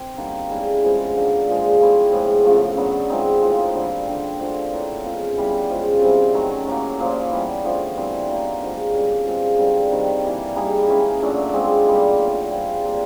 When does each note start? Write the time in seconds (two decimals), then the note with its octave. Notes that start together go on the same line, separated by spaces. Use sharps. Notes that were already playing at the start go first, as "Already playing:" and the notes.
Already playing: C4
0.17 D3 G3 A#3 D#4
0.50 G#3 C#4 E4 A4
0.83 A2 F3 G#3 B3
1.16 D3 F#3 A#3 D4
1.47 A#2 F3 G#3
1.80 F3 A3 C4 E4
2.12 A2 F3 G#3 B3
2.45 C#3 F3 A3
2.77 D3 F#3 B3
3.09 F3 G#3 C4 D#4
3.42 A2 F3 A#3
3.74 D3 G3 C4
4.07 D3 G3 C4
4.40 D3 F3 A3
4.72 A2 F#3 A#3 D4
5.04 B2 G#3 C#4 F4
5.37 E3 G3 B3
5.70 F3 G#3 C#4 F4
6.02 C3 E3 G3 C4
6.34 D#3 F#3 A3 C#4
6.67 A2 F#3 A#3
6.99 A#2 F3 A#3
7.31 E3 G3 B3
7.64 D3 F3 A3
7.97 E3 G3 C4
8.29 B2 F#3 A#3 D#4
8.61 D3 F3 G#3
8.94 B2 G3 A#3 C#4
9.26 F3 G#3 C4
9.58 D3 G3 C4 D#4
9.92 C3 D#3 G3
10.24 E3 G3 A#3 D4
10.56 G3 A#3 D#4 G#4
10.88 E3 G#3 C#4
11.21 A#2 F#3 A3 D4
11.53 G#3 C4 F4 A4
11.86 B2 G3 A#3 D#4
12.18 A#2 F#3 A3
12.51 G3 C4 F4 G#4
12.83 A#2 G3 A#3 D4